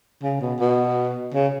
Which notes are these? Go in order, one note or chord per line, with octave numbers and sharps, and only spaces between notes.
C#3
B2
B2
C#3